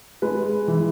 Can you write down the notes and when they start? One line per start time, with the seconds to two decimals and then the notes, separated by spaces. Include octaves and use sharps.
0.22 G#3 B4
0.68 E3